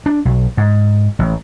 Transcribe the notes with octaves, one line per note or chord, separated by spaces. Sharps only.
D4
B1
G#2
A1